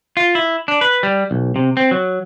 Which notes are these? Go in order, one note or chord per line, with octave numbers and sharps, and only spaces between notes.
F4
E4
D4
B4
G3
B1
C3
C4
F#3